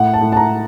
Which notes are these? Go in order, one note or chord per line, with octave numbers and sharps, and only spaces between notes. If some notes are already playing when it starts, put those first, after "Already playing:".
Already playing: A2 F#5
A5
A2
A5
A#5